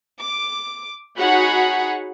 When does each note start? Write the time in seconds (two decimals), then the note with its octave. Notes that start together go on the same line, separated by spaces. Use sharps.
0.18 D6
1.18 D#4 F#4 G#4 C#5 F#5 B5